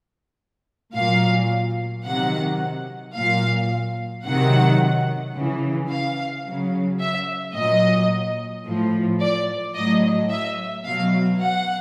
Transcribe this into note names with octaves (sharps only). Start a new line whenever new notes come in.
A#2 F#3 F5
C3 D#3 F#3 F#5
A#2 F#3 F5
C3 D#3 F#3 F#5
C#3 E3
F5
C#3 F#3
E5
A#2 F#3 D#5
A2 F3
D5
A2 F#3 D#5
E5
B2 F#3 F5
F#5